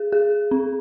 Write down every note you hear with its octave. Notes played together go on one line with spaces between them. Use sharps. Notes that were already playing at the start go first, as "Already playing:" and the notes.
Already playing: G#4
G#4
C4